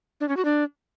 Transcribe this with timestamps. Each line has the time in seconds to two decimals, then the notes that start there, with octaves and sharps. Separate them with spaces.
0.20 D4
0.29 C#4
0.37 F#4
0.45 D4